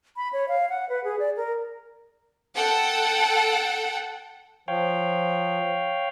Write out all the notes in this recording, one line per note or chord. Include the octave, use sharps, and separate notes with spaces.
B5
C#5
F5
F#5
B4
G#4
D5
A#4
A4 F#5 G5
F3 C#5 F5 G5